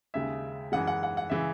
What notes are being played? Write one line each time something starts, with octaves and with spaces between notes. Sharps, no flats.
D#2 C#3 G#3 E5
F#2 E3 G#3 F#5
F#5
F#5
F#5
C#3 E3 G#3 E5